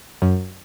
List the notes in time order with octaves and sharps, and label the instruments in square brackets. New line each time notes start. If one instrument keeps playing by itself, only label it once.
[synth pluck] F#2